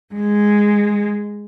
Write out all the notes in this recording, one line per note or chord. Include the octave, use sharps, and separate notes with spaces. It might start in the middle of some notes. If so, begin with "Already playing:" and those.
G#3